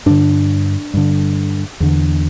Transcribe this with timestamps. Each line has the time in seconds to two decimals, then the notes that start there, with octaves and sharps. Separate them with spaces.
0.06 G2 D3 D4
0.94 G2 D3
1.80 E2 D3